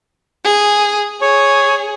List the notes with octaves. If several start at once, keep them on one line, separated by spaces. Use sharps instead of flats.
G#4
G#4 C#5